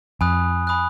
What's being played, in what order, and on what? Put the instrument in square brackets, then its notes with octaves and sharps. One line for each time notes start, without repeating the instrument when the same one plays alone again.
[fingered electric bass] F2 [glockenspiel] G#5 B5 D#6 F#6
[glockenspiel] G#5 B5 D#6 F#6